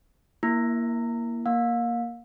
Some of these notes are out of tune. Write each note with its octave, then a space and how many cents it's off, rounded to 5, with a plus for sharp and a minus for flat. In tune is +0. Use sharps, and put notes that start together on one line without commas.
A#3 +10 E4 +10
A#3 +5 F5 +30